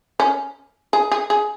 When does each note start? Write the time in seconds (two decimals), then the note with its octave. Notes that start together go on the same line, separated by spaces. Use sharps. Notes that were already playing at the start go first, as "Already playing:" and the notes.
0.20 C#4
0.93 G#4
1.12 G#4
1.30 G#4